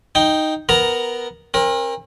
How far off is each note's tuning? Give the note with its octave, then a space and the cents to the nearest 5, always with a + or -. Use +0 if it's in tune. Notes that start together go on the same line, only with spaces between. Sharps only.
D#4 +0 G5 +0
B3 +5 A#4 +10 A#5 +0
C4 +45 A#4 +15